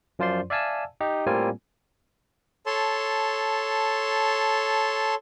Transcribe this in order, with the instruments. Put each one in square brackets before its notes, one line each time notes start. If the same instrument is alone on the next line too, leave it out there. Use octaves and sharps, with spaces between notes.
[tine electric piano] F#2 F3 F4 C5 D5 C6
D5 E5 F5 G#5 A5 E6
D#4 G4
A2 G3 A#3 C4 F4 G#5
[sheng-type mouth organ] A4 C#5 A5 C6